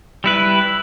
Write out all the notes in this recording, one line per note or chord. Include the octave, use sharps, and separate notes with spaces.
G3 E4 B4